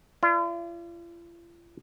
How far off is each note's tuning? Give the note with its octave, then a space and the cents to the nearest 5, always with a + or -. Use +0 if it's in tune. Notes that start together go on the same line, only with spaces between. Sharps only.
F4 -45 D5 +0